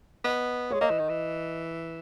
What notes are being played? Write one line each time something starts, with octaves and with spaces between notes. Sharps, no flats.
B3 D#5
G#3 C#5
A#3 D#5
E3
D#3
E3